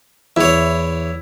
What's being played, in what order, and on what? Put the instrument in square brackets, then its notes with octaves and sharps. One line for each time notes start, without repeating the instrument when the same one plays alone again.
[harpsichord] E2 C#5 [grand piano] E4